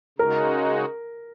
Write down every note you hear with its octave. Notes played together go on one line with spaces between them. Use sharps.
C#3 G#3 D#4 F#4 A#4